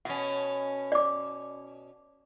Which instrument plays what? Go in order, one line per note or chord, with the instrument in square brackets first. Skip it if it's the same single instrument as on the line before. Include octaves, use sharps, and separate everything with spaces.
[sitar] B2 C#4 [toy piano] F#5
[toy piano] D5 D6